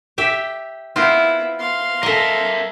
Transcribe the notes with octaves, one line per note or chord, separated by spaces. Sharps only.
G4 E5
B3 C4 E4 F4
F5 C6
A4 A#4 D#5 E5